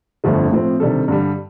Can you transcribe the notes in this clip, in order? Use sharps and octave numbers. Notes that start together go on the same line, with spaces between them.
G1 F2 D3 F3 A3
A2 F3 C4
C3 D#3 G3 D4 A4
G2 D3 G3